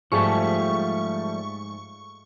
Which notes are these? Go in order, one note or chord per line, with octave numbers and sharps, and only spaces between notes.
G#2 F3 G3 A3 G#4 A5 C#6